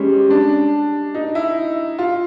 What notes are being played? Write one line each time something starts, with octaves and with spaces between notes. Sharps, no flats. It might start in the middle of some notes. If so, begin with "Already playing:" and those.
Already playing: G3 G#3 C#4
D4
D#4
E4
F4